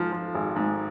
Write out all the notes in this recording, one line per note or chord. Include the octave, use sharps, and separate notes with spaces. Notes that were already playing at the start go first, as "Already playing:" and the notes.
Already playing: G#2 F3
F3
G#1
G#2